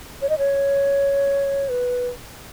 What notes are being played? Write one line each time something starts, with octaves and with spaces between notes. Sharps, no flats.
C#5
D#5
C#5
B4